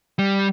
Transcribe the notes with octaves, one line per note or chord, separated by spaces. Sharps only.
G3